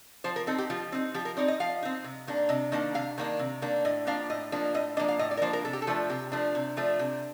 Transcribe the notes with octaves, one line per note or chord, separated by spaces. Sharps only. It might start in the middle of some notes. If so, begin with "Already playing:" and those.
F3 C5
A#4
C4 D#4 A4
G4
F3 F4
C4 D#4
F3 G4
A#4
C4 D#4 D5
D#5
F3 F5
C4 D#4
C3
D#3 A#3 D4
C3 D#5
D#3 A#3 D4 D#5
C3 F5
D#3 A#3 D4
C3
D#3 A#3 D4
A2 D#5
F3 A#3 D4 F5
A2 D#5
F3 A#3 D4
A2 D#5
F3 A#3 D4 D#5
F5
A2 D#5
D5
A#4
F3 A#3 D4 C5
A#4
C3 A4
G4
A4
F3 A3 D4
C3 G4
F3 A3 D4
C3
F3 A3 D4
C3